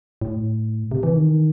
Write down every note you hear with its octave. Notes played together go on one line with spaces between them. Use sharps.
A2
C3
E3
D#3